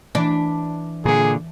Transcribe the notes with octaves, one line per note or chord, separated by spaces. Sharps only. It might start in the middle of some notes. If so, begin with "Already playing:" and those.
E3 D4 B5
A#2 D3 G#4